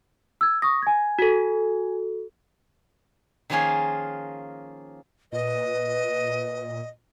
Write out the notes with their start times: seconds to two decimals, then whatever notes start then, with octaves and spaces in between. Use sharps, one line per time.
0.41 E6 G#6
0.62 C#6 D#6 A#6
0.82 G#5 G#6
1.19 F#4 A4
3.50 D#3 F3 A#3 C#4 F4 G#4
5.32 A#2 B4 D#5